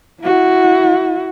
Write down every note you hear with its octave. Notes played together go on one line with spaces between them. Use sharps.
E4 F#4